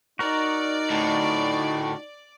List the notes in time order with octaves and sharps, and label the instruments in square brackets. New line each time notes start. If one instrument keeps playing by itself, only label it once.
[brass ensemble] D#4 [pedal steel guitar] F#4 A#4 [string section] D5
[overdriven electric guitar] D2 A2